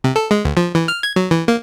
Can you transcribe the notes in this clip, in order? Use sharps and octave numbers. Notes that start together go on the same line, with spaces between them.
C3
A4
G#3
D2
F3
E3
F6
G#6
F#3
E3
A#3